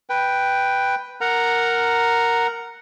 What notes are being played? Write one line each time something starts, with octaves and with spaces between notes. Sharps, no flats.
B4 G5
A#4 F#5 A#5